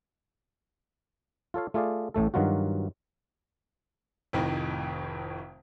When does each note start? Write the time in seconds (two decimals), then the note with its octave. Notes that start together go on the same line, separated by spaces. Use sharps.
1.54 F4 A4 C#5 F5
1.74 A3 F4 G#4 D5 F5
2.14 A1 A2 A3 A4
2.34 G2 D#3 F#3 F4 F#4
4.33 F1 F2 A2 C3 D#3